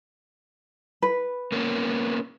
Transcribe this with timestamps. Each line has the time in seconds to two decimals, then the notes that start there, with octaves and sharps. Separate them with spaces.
1.02 B4
1.52 A#3 B3 C#4